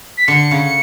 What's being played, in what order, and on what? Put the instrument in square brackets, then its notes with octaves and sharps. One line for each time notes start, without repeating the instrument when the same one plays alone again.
[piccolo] B6
[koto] D3 [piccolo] C#7
[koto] C#3
[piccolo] C#7